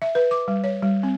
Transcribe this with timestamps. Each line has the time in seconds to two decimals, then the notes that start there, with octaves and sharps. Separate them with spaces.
0.02 E5
0.15 B4
0.31 D6
0.48 G3
0.64 C#5
0.83 G3
1.03 C4